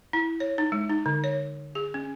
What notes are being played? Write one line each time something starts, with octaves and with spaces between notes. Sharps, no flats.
E4
C#5
D#4
G#3
D#4
D3
C#5
G#4
C#4